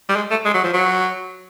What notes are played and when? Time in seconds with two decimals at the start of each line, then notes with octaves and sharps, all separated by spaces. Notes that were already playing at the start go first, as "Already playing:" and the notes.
0.09 G3
0.16 G#3
0.30 A3
0.45 G#3
0.54 F#3
0.64 F3
0.73 F#3